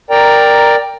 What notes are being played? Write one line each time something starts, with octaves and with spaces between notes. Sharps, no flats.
A#4 D5 G5 A#5